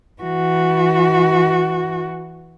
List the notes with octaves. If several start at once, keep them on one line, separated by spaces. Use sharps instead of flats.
E3 F#4